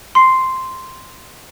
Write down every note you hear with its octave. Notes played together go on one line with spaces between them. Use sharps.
C6 C7